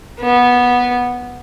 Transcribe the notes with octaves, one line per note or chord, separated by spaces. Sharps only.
B3